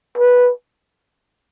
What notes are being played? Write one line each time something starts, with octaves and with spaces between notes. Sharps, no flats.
B4